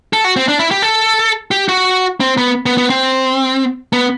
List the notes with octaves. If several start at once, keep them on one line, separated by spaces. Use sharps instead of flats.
A4
F#4
C4
D4
E4
G4
A4
G4
F#4
C4
B3
B3
B3
C4
B3